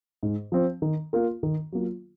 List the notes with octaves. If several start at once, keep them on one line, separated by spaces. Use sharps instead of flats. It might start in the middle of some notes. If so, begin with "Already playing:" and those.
G#2
F3 C4
D#3
A#3 F4 A#4
D#3
F#3 A#3 F4